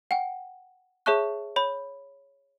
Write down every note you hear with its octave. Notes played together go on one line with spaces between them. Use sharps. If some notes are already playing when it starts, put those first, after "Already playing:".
F#5 G5
G#4 C#5 E5 A5 C#6 F#6
C#5 B5